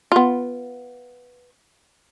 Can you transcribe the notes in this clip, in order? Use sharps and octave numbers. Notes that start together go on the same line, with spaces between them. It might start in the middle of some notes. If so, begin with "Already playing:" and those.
B3 F4